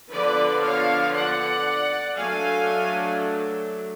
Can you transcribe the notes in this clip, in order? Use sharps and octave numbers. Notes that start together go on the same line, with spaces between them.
D3 F3 B3 D4 B4 D5
C#5 F5
D5 F#5
F#3 A3 D4 F5 G#5